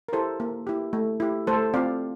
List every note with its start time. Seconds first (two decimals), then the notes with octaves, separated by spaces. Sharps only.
0.08 A#4
0.13 E4 G4 A4 C5
0.40 A#3
0.67 E4 G4
0.93 A3
1.20 E4 G4
1.47 A3 A4 C5
1.74 C4 F4 D5 F5